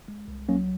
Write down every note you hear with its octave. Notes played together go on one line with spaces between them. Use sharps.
G#3
C2
F#3 A#3 C#4